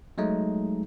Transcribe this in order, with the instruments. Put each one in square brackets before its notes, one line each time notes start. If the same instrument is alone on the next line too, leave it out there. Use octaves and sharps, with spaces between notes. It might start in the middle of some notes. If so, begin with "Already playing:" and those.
[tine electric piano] F#3 G#3 A3 D#4